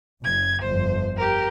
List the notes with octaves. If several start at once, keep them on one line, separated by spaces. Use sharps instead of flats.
F#1 G#6
G1 F2 C5
G4 A#4